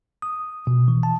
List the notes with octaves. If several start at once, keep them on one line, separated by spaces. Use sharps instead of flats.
D#6
B2
E3
A5